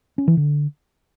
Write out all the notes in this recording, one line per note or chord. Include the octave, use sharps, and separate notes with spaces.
C#4
E3
D3